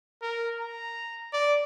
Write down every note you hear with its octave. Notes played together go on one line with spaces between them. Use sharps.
A#4
A#5
D5